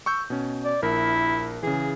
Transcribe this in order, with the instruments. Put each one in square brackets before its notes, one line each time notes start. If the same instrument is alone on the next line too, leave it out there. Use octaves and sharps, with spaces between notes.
[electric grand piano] C#6 E6 G6
B2 C#4
[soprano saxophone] D5
[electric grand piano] A#1 A#4 [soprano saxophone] E4
[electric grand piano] C#3 E3 [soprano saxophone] G#4